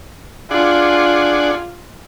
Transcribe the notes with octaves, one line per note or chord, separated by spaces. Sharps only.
D4 F4 G#4 F#5